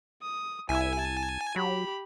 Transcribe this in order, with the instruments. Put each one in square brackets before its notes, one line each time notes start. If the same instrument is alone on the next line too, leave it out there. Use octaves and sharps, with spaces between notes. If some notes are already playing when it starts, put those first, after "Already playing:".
[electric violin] D#6
[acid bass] C2 [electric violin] E4 E5 [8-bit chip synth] G#5
[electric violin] A5
[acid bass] F#3 [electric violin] G4 B5